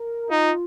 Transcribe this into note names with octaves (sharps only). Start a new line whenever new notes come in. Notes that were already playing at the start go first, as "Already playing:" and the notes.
Already playing: A#4
D#4 F4